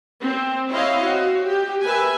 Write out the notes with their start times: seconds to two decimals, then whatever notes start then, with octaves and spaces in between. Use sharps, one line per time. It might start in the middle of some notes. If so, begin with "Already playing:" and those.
0.22 C4
0.69 C4 E4 C#5 D#5 F5
1.02 F#4
1.45 G4
1.83 A#4 B4 E5 G#5